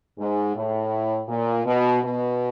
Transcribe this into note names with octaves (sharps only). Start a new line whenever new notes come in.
G#2
A2
A#2
B2
B2